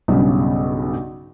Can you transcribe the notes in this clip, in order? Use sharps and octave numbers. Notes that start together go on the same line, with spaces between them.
B1 G2 C#3